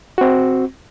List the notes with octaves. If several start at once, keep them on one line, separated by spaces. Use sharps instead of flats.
C4 F#4